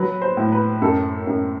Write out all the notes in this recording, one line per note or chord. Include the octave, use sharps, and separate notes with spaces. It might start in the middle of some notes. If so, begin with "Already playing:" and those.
Already playing: F#3 B4
C5
A2
B4
F#2 A4
F#2